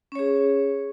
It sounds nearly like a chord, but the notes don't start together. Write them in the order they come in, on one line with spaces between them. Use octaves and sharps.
C#4 C#5 G#4